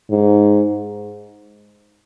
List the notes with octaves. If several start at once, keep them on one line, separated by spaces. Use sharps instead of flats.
G#2